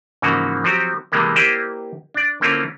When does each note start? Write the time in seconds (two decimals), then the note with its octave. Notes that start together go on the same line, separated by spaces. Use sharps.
0.22 G#2 C#3 E3 F3 A#3 F#4
0.64 F3 F#3 C4 F#4 G4
1.12 C3 E3 G3 G#3 A#3 B3
1.36 A#3 E4 G4 C5 D5 D#5
2.14 D4 D5
2.41 D3 A#3 C4 C#4 E4 F4